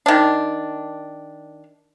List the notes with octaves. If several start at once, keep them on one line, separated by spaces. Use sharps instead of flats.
D#3 D4